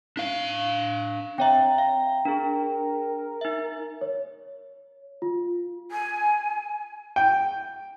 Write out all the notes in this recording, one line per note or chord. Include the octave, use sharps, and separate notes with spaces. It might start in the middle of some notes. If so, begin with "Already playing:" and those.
D4 F5
C4 C#5 E5 G5 A#5
F5
D4 G#4 A#4
D#4 E5
C#5
F4
G#5
G5